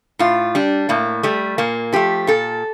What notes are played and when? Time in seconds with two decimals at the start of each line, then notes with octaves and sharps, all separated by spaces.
0.19 A2 F4
0.55 G3 D4
0.89 A2 A#3
1.23 G3 A3
1.58 A#2 A#3
1.93 F3 A3 G4
2.27 A#2 A4